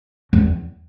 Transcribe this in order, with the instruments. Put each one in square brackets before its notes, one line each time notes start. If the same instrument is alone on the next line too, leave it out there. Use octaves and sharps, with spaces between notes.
[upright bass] E2